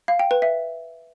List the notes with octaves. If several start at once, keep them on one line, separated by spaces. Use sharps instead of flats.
F5
G5
B4
E5